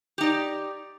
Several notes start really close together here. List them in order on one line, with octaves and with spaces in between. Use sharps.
G4 D#4 D5